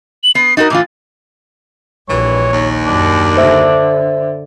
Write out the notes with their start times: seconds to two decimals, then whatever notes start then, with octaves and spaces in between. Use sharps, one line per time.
0.24 F#7
0.35 B3 C7
0.57 D#4 F#4 A#4 A6
0.70 A2 E3 F4 D6
2.09 A#1 G2 E3 C#5
2.52 D#2
2.86 F#2 D4
3.37 D3 C5 E5